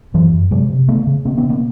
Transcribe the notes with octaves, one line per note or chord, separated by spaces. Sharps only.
F#2 E3 F#3
F#2
C3 F#3 G#3
C3
C#3 A3 B3
C#3
B2 A#3 C4
B3 C#4
B2
A#3 C4